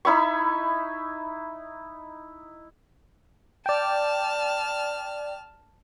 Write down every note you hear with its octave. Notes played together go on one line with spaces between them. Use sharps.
D#4 E4 B5 C#6
D5 G5 A5 F6